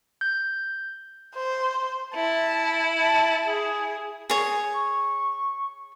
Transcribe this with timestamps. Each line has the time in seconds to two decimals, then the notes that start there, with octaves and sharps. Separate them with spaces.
0.21 G6
1.35 C5
2.15 E4 A5
3.01 A5
3.46 G#4
4.30 G#4 C#5
4.74 C#6